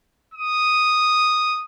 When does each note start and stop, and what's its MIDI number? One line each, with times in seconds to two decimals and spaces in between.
0.34 1.65 87